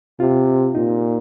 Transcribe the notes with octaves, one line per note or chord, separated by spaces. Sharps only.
C3 F4
A#2 D#4